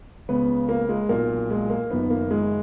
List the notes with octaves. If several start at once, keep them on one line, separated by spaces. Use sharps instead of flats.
C#2 C#3 B3
A#3
G#3
B1 A#2 A#3
G#3
A#3
F#1 F#2 D#3 B3
A#3
G#3